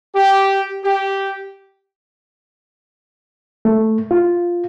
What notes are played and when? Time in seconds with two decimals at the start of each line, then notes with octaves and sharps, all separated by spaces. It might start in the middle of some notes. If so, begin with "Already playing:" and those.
0.15 G4
0.84 G4
3.65 A3
4.11 F4